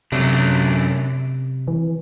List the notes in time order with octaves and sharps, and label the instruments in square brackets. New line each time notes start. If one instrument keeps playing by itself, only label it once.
[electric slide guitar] F#2 F#3 A3 D4 [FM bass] C3
[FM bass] E3